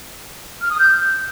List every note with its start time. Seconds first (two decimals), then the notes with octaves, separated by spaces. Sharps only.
0.62 F6
0.70 D#6
0.78 G6